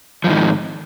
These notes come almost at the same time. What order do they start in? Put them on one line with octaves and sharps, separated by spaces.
F3 F2 D#3 G#2